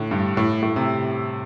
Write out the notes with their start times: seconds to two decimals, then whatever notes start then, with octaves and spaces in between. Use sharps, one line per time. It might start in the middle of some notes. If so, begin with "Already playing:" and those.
Already playing: A2 D3
0.11 G2
0.37 A2
0.62 A2
0.76 C3